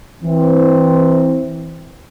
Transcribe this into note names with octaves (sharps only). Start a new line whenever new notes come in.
E3 C4